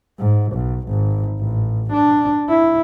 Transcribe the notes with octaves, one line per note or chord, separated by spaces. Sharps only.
G#2
B1
G#1
A1
D4
E4